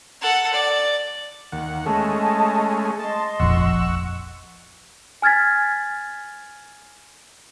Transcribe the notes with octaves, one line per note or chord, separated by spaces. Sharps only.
A4 F#5
D5
D#2 F#5
G#3 A3 C#4 D#5 A5
D#5 A5 C6
F1 A#1 F2 F#5 C#6 E6
G#5 F6 G#6 A6 B6